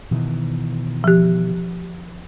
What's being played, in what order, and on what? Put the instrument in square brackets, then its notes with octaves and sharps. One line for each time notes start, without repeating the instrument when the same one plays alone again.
[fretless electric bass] B2 D#3 E3
[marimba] F3 G4